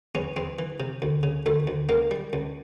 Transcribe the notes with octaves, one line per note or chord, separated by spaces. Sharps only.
E2 C#4
E2 C4
E3
C3
D2
C#3
D2 A3
D2
C#2 A#3
G3
C#2